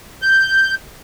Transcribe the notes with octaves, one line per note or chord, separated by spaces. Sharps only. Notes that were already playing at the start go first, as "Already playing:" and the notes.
G6